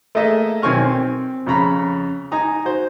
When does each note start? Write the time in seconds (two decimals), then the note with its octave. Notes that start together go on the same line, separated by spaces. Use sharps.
0.15 A3 A#3 G#4 D#5 E5
0.62 B1 D#3 C4 G#5 C#6 F6
0.85 C4
1.47 F2 C#3 A#5 B5
2.32 D#4 G#5 A#5 D#6
2.65 F#4 C5